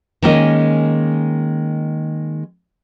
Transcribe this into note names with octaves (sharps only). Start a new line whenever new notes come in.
D#3 G#3 A#3 C#4 A#4 D#5